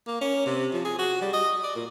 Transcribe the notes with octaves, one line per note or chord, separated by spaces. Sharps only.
A#3
C#4
C3
F3
G#4
F#4
G3
D#5
D5
A#2